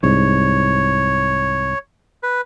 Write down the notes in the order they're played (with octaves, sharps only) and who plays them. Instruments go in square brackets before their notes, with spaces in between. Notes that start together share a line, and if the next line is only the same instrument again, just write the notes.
[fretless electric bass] C2 G#2 [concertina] C#5
[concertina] B4